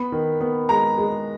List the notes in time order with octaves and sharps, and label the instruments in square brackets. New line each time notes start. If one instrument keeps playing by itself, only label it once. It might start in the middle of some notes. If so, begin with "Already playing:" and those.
Already playing: [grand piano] B3 B5
D#3
B3
G#3 A#5
G#3